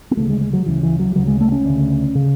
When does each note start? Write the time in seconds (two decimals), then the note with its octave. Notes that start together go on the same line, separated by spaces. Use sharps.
0.11 B3
0.17 D2 C#3 A3
0.30 G#3
0.41 G#3
0.53 F#3
0.66 D2 C#3 E3
0.83 E3
0.99 F#3
1.16 D2 C#3 F#3
1.28 G#3
1.41 A3
1.52 C#4
1.65 D2 C#3
2.15 C#3